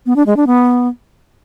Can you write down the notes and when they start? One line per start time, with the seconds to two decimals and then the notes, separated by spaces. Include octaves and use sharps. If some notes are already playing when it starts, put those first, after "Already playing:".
0.06 B3
0.16 D4
0.26 G#3
0.37 D4
0.47 B3